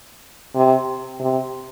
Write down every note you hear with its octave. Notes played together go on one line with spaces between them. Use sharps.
C3
C3